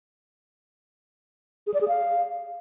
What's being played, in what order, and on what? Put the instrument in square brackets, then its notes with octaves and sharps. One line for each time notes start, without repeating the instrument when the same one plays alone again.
[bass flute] G#4
D5
G#4
F5